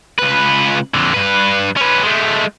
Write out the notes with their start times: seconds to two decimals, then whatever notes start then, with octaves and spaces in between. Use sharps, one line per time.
0.18 C#2 B4
0.94 F2 D3
1.14 G2 B4
1.77 C#4 B4
2.03 G#3 A3